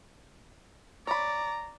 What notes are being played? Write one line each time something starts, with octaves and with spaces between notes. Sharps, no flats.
C#5 D5 A#5 B5